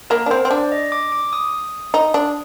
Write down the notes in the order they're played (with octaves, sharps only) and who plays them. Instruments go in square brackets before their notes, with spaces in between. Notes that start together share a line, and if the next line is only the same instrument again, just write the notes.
[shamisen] A#3 [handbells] A#4
[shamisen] D4
[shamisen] C4 [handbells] C5
[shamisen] C4
[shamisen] D4 [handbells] D5
[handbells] D#5
D6
D6
D#6
[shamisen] D#4
D4